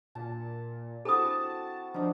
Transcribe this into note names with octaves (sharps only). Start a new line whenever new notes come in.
A#2 A5
C3 E4 F#4 A4 A5 D#6
F3 D4 D#4